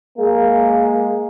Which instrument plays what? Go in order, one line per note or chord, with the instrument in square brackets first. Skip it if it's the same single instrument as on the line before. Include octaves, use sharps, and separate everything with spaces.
[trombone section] G#3 A#3